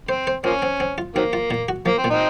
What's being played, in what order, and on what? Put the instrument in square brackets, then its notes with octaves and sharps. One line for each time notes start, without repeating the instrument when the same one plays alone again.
[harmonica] C4 [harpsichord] C5
[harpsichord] C5
[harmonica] F3 A#3 C#4 [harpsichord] C4
[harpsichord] C4
C4
F4
[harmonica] D#3 F#3 A#3 [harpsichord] C4
[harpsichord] F4
A#2
F#4
[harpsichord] F3 [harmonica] A#3
[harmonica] C4
[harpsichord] A#2
[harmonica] C4 D#4